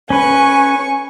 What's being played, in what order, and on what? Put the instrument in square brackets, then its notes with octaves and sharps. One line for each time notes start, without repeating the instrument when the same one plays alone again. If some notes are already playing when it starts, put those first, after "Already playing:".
[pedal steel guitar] C#4 B4 [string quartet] G#5 C#6